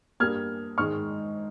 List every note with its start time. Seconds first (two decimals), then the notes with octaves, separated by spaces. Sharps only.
0.20 G2 G3 A#3 F6 G#6
0.78 G#2 D#3 G#3 C#6 F6